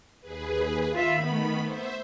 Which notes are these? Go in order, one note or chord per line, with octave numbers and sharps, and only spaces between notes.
D#2 G#4 B4
D#3 F4 E5 B5
A3 B3
C5 E5